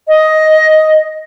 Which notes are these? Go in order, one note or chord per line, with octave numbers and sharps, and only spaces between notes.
D#5